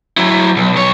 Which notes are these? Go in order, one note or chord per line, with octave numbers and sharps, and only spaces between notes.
F#3 E4
B1
B1 C#5